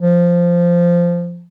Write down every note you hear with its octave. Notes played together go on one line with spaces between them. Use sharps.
F3